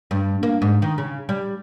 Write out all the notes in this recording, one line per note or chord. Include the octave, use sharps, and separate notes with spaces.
G2
A#3
G#2
D#3
C#3
G3